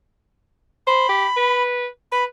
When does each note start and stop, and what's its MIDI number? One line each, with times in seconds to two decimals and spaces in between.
0.87 1.08 72
0.87 1.63 83
1.09 1.26 67
1.36 1.87 71
2.12 2.26 71
2.12 2.24 83